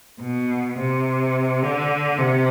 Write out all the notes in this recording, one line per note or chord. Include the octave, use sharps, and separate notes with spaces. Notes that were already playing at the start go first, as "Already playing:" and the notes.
B2
C3
D3
C3